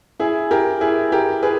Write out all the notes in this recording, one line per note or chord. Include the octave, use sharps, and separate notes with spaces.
E4 G#4
G4 A#4
E4 G#4
G4 A#4
G#4 B4